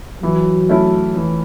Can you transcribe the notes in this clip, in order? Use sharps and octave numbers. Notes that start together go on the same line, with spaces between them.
E3 F#3
A3 C#4 E4
E3